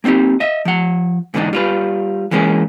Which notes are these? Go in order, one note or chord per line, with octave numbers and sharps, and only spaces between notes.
A#3 C4 D4 D#4 G4
D#5 E5
F3 F#5
G#2 D3 E3 G3 D4 D#4
G3 F4 B4
E3 G#3 A#3 C#4 E4 G#4